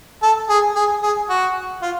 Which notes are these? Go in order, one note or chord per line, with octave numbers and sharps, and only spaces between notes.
A4
G#4
G#4
G#4
F#4
F4